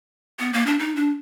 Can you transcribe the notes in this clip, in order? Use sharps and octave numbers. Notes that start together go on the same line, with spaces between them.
B3
A#3
D4
D#4
D4